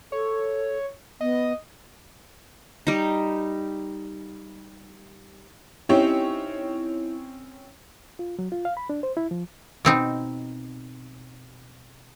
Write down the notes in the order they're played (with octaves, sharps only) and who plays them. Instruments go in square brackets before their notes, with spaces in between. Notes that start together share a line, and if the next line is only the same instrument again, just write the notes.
[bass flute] A4 [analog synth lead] C#5
[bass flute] B3 [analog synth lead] D#5
[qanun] G3 D#4
[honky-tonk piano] C4 C#4 C#5 [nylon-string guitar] D#4 G4 [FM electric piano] E4
[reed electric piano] F4
F#3
F4
F5
B5
D4
C5
E4
F3
[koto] B2 C4 D#4